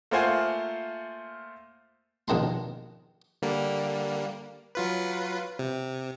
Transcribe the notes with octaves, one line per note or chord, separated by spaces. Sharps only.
A3 A#3 F4 C5 F#5 G#5
A#1 B2 D#3 A#5 C6
D3 G3 A#3
F#3 F4 B4
C3